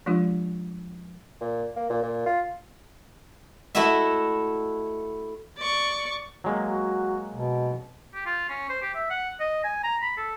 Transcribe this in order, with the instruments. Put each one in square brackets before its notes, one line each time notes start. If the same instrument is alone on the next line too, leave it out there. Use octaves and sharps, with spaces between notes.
[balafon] F3 G#3 D4 F4 G4
[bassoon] A#2
A#3
A#2
A#2
F4
[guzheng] A3 E4 F#4 D#5 E5
[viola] D5 C#6
[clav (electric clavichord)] F#3 G#3 A#3
[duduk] F#4
B2
[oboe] G4
F4
C#4
C5
G4
E5
F#5
D#5
G#5
A#5
B5
A4